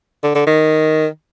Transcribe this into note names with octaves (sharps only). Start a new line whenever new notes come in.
D3
D3
D#3